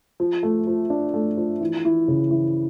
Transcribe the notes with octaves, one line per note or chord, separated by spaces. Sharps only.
F3
A3
F3
D4
A3
F3
E3
E3
C#3
E3